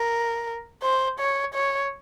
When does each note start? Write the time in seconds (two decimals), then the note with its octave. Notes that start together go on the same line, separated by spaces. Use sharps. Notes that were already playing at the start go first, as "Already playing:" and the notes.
Already playing: A#4
0.83 C5
1.19 C#5
1.54 C#5